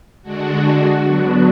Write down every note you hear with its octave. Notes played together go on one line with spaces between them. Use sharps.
D3 G#3 D4 F#4
D3 F#3 B3 D4